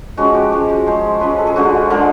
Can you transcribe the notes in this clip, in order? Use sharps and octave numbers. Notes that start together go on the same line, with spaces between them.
F3 G#3 C#4 F#4
G4
F3 G#3 C#4
F#4
F3 G#3 C#4 C5
C5
F3 G#3 C#4 B4
A4
G#4
D3 F3 G#3 F#4
D3 F3 G#3 A#4